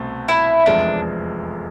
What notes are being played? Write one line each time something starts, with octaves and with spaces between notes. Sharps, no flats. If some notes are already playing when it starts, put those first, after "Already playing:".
Already playing: C2 B2 A3 C4
E4
F1 E2 C3 F3 G#3 D4